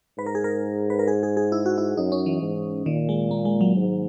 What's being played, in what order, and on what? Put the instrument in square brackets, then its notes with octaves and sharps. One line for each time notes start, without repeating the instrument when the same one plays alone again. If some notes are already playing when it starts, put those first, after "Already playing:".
[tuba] G#2 [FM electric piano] B4
[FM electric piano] A#4
G#4
A#4
B4
A#4
G#4
G#4
G#4
E4
F#4
E4
[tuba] F#2 [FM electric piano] D#4
[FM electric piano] C#4
E3
[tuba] G#2
[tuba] A#2 [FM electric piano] D#3
[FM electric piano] G#3
A#3
G#3
F#3
[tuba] G#2